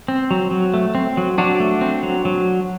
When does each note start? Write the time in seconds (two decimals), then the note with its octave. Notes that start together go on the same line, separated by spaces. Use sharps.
0.08 C4
0.31 F#3
0.51 F#3
0.74 A3
0.95 C4
1.17 F#3
1.38 F#3 D4 F#4
1.60 A3
1.81 C4
2.03 F#3
2.25 F#3